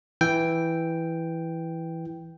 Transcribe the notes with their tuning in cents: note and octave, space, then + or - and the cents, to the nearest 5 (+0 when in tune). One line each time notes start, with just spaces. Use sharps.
E3 +0 G5 +0